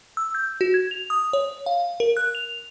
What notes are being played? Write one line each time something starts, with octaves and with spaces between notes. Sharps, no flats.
E6
G6
F#4
G#6
F7
D#6
C#5
F5
A#4
F#6
F7